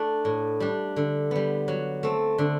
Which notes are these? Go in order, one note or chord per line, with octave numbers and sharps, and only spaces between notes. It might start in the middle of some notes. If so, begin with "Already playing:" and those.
Already playing: A3 D4 E4
A2
G3 D4
D3
G3 B3
F#3
A3 C4
D3